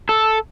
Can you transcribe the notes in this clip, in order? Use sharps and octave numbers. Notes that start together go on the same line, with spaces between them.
A4